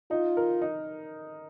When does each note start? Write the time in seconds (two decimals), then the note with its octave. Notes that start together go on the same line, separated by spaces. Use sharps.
0.11 D#4 F4
0.37 A#4
0.62 D#4